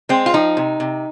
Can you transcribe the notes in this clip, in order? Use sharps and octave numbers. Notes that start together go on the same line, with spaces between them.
G#3 C4
F4
F3 D#4
C3
C3